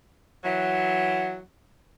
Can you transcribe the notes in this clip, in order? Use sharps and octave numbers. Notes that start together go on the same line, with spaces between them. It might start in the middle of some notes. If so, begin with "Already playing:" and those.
E3 F#3